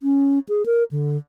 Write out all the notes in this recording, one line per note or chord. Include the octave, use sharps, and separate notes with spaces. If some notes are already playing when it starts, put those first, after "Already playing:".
C#4
G#4
A#4
D3